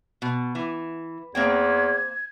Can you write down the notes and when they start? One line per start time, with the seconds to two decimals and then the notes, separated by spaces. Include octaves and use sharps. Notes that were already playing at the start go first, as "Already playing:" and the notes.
0.22 B2
0.55 E3
1.35 E2 A#3 C4 G5 G#6